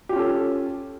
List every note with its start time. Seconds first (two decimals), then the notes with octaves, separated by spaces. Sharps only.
0.09 G4
0.13 F4
0.16 C#4
0.19 A4